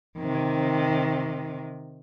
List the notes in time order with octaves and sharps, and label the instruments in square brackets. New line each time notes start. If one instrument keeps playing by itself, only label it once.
[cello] C3 D#3